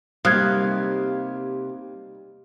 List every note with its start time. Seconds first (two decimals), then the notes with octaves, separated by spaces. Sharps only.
0.25 C3 G3 A#3 D#4 F5 D#6 F#6 G#6